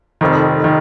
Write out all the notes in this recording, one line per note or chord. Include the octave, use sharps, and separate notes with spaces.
F1 F2 D#3
D#3